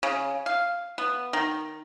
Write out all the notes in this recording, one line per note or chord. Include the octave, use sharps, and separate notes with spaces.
C#3
F5
B3
D#3